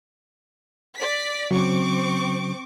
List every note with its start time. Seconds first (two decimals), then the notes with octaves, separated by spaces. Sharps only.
0.97 D5 B6
1.51 C#3 F#3 C4 C#4 C#6 D6